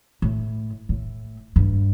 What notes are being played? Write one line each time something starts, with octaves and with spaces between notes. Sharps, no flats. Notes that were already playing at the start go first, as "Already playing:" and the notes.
A2
A2
G2